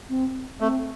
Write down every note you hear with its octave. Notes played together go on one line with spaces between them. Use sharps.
C4
A3 C4